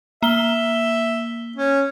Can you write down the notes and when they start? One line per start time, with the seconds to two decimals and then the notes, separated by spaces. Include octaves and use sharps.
0.23 A#3 E5 G7
1.56 C#4